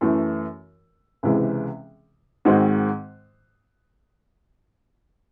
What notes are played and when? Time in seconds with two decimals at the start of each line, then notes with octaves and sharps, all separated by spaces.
0.01 F#2 E3 A3
1.23 C#2 C3 E3 G#3
2.45 G#2 D#3 G#3 C4 F#4